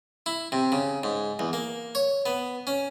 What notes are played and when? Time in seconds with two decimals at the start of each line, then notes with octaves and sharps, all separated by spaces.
0.26 E4
0.52 C3
0.72 C#3
1.03 G#2
1.39 E2
1.53 A#3
1.95 C#5
2.26 B3
2.67 C#4